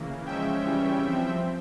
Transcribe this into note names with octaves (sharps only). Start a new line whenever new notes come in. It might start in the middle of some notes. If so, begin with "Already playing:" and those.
Already playing: C#3 E3 A#3
F3 G#3 C#4 E5 G5
C#3 E3 G3 C#4
F3 C4